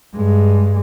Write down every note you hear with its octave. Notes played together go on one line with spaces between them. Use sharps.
G2 G#3